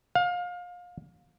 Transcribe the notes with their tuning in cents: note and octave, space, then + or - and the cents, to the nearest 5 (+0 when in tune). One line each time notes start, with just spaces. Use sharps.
F5 +30